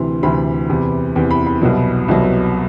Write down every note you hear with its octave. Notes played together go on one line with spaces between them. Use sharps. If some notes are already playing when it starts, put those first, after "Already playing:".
Already playing: D2 C3 E3 C6
D2 C3 E3 B5
E2 C3 E3
E2 C3 E3
B5
B5
C2 B2 F#3
C2 B2 F#3